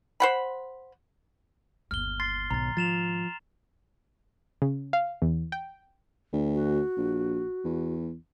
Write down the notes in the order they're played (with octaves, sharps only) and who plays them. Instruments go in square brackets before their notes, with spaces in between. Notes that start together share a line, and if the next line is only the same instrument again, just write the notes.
[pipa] C5 F#5 B5
[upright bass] G1 D#2 [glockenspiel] F6 G7
[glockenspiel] C6 A6 C7
[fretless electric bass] B1 [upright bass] G#2 D#3 [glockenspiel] A#5 A6
[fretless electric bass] F3 [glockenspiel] A6 E7 F7
[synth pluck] C#3
F5
E2
G5
[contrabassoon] D2
[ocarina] F#4
[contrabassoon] A#1
E2